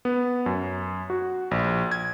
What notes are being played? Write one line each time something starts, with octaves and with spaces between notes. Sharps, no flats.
B3
F#2
F#4
A#1
G#6